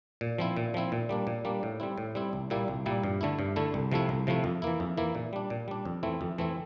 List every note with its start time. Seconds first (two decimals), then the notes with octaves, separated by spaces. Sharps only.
0.21 A#2
0.38 F3 C4 E4
0.57 A#2
0.74 F3 C4 E4
0.92 A#2
1.09 G3 A#3 D4
1.27 A#2
1.45 G3 A#3 D4
1.63 A2
1.80 G3 C4 E4
1.98 A2
2.15 G3 C4 E4
2.33 C2
2.50 A#2 G3 A#3 E4
2.68 C2
2.86 A#2 G3 A#3 E4
3.04 G2
3.21 D3 A3 E4
3.39 G2
3.56 D3 A3 E4
3.74 C2
3.91 C3 F3 A3 E4
4.09 C2
4.27 C3 F3 A3 E4
4.44 F2
4.62 E3 A#3 E4
4.80 F2
4.97 E3 A#3 E4
5.15 A#2
5.33 G3 D4
5.50 A#2
5.68 G3 D4
5.85 F2
6.03 E3 A3 C4 E4
6.21 F2
6.38 E3 A3 C4 E4